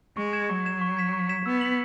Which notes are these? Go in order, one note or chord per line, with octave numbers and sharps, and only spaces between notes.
G#3 C#6
G#6 E7
F#3 C#6
G#6 E7
C#6
G#6 B6 E7
C#6
G#6 B6 E7
B3 E6
B6 F#7